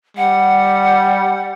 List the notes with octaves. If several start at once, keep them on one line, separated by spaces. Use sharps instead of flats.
G3 F#5